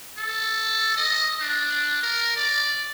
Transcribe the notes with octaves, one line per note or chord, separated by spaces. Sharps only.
A4
D#5
D4
A#4
D5